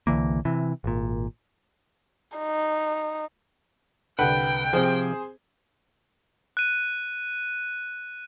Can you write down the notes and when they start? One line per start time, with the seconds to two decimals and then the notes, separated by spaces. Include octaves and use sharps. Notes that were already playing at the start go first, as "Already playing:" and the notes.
0.07 C2 D3 E3 A#3
0.45 C3 E3
0.84 G#1 A#2
2.37 D#4
4.19 C2 D3 B4 F#5 G5
4.73 C3 F3 C4 G#4 C5
6.57 F#6 D#7